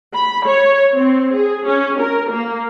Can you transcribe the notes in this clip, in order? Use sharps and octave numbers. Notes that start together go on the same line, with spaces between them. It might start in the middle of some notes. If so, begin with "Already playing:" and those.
B5
C#5
C4
G#4
C#4
A#4
A#3